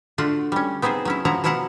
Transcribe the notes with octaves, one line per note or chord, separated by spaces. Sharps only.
D3 A3 F4 F#4 F#5
G3 C#4
B3 C4 D#4 G#4 C5
F#3 C#4 E4
F3 F#3 E4 F#5 A#5
B2 F3 E4 F5 F#5 A#5